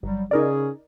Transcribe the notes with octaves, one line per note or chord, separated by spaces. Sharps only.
G1 F#3 G3
C#3 C#4 D#4 G#4 A#4 D5